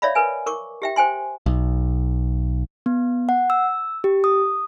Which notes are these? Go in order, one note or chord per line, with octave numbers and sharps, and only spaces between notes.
C#5 D5 E5 F5 B5
A#4 B4 G#5
A#4 C#6 D6
G4 E5 G5
C5 G5 G#5 C6
B1
B3
F#5
E6
G4
D#6